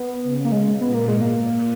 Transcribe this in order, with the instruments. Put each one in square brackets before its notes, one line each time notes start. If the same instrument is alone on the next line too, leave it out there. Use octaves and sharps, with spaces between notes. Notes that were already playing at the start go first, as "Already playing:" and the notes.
Already playing: [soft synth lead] B3
[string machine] C#3
[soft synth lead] A#3
[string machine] B2 [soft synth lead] G#3
[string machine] A#2 [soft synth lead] B3
[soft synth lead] A#3
[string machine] G#2 [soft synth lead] G#3
[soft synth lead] A#3
[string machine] A#2